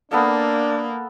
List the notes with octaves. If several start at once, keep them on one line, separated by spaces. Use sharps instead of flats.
A#3 B3 D4 A4 F5